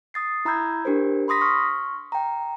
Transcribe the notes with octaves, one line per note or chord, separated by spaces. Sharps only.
D#6 A6 C7
E4 A#5 B5 E6 G6 G#6
D4 G4 A#4 C5
B5 C6 D#6 A#6 B6
C#6 F6
G5 A#5